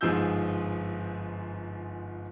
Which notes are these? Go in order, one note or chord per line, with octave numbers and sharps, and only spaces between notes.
G1 G#2 F3 G#4 E6 G6